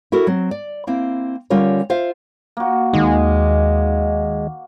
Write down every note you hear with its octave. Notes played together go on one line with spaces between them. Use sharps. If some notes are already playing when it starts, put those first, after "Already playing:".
E4 F#4 A4 A#4
F#3 C4
D5
A#3 C4 E4
D3 G3 C#4 F4 A#4 C#5
F4 C5 E5 F5
A#3 F#4
D#2 D#3 G#3